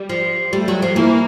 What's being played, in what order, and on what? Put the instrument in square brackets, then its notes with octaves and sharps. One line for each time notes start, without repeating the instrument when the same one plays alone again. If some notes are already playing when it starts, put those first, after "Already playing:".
Already playing: [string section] G3
[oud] F3
[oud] G3 [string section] A3
[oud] F#3
F3
[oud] E3 [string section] A#3